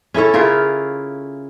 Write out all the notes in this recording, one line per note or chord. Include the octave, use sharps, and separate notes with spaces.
C#4 E4 A4 C#5
C#3 E4 F4 A#4